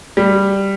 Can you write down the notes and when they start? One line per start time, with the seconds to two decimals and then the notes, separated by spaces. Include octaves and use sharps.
0.17 G3